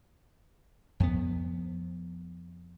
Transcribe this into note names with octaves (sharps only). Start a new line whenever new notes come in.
F2 B3